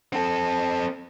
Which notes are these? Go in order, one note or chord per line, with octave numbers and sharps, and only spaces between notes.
C4 A4